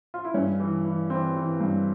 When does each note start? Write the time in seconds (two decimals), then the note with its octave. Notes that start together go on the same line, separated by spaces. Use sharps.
0.14 F4
0.25 E4
0.34 G2 C#4
0.60 E3
0.85 E3
1.10 E3 C4
1.36 E3
1.61 G2